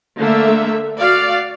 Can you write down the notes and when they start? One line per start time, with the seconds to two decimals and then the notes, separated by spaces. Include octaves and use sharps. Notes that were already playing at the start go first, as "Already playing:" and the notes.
0.19 D3 A3 A#3 E5
0.99 F#4 D5 F5